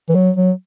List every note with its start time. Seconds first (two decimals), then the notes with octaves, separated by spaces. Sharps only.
0.09 E3
0.15 F#3
0.36 F#3